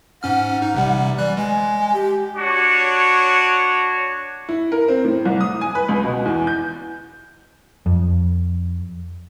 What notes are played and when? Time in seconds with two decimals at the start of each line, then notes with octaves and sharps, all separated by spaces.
0.23 G#2 C#4 F#5 F6
0.62 D#4
0.74 A1 C3 G3
1.18 E3 G3 D5 F#6
1.37 G#3 G#5
1.94 G4
2.36 D4 F#4 C#5
4.49 E4
4.72 A#4
4.88 C4
5.04 A2
5.25 C2
5.41 D#6
5.61 G#5
5.75 B4
5.89 C#2
6.04 B2
6.25 E2
6.47 G6
7.86 F2